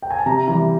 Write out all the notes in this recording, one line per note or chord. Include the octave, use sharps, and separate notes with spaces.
G5
G#5
A5
C3 A#5
E3 G3